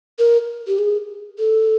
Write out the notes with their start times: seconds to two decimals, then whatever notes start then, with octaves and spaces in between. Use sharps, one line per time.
0.19 A#4
0.67 G4
0.78 G#4
1.39 A4